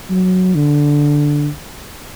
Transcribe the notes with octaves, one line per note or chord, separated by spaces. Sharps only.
F#3
D3